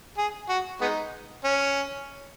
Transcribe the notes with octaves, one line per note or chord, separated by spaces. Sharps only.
G#4
F#4
G#3 B3 D#4
C#4